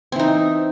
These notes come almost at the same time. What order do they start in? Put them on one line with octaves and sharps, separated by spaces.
C4 E3 D#4